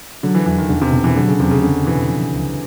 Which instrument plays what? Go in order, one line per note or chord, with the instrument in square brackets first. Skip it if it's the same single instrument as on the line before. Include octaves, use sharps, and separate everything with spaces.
[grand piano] D3 [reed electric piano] F#3
[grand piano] E3
[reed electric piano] E2 [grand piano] E3
[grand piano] D#3
[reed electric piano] E2 [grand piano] D3
[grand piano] C3
[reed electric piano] B2
[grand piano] E3
[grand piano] D3 [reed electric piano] F#3
[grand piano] C#3
[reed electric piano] E2 [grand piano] C3
[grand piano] C#3
[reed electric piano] E2 [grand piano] D3
[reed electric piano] B2 [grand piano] E3
[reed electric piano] F3
C#2